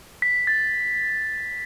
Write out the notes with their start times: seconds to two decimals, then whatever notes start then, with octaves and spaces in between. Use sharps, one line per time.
0.22 B6
0.47 A6